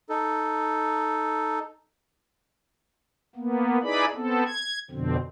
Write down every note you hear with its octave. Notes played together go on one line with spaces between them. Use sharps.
D#4 A4
A#3 B3
D#4 E4 G#4 B4 D5 B5
B3 C4 A4
G#6
F2 B2 D3 C4